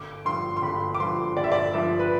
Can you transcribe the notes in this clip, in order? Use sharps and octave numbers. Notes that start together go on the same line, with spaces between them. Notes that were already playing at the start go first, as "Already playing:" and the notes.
Already playing: G1 D6
G2 F3 C6
C6
G1 B5
D6
G2 F3 C6
G1 D5
E5
D5
G2 F3 E5
B4